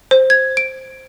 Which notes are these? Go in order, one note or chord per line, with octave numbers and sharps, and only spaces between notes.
C5
G#6
D7